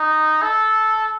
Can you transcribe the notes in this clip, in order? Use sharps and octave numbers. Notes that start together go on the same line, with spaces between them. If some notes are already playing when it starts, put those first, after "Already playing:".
Already playing: D#4
A4